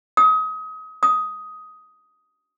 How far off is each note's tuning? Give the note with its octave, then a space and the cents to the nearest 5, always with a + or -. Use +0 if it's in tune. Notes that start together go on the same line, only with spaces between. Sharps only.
D#6 +30
D#6 +10